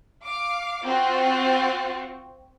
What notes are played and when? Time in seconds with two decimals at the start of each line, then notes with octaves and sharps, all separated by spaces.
0.23 F5 D6
0.85 C4 F4 F#4